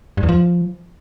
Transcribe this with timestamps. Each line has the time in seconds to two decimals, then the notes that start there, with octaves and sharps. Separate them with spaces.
0.17 G2
0.23 E2
0.29 F3